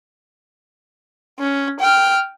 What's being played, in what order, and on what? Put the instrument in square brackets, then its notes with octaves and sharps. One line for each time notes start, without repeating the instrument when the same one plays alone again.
[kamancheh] C#4
G5 F6